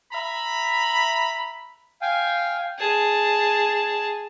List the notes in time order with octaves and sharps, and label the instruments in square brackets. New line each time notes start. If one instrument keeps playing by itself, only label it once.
[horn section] E5 A#5 B5
[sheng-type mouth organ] F5 G5 G#5
[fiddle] G#4 A5